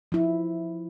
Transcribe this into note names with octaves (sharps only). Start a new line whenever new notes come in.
F3 E4